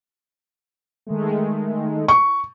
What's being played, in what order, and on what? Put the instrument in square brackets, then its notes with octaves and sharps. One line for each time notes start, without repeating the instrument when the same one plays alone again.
[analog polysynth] D#3 G#3 A3
[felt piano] C#6